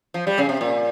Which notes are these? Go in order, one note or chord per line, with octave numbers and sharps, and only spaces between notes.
F3
G3
C#3
C3
A#2